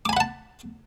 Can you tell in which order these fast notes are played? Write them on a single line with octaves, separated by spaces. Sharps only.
D6 G#5 B5 F#5 A5